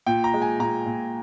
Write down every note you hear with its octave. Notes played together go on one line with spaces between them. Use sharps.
A#2 G5
A#5
G#3
G#5
A#2 A#5
A#2